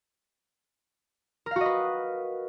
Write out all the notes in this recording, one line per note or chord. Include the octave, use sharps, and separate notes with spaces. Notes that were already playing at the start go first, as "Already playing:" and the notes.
F#4 A#4 B4 D#5 F5